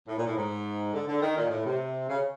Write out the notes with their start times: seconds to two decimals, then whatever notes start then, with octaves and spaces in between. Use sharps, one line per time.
0.08 A2
0.17 A#2
0.27 A2
0.36 G#2
0.93 D3
1.08 D3
1.22 D#3
1.37 A#2
1.50 A2
1.66 C3
2.09 C#3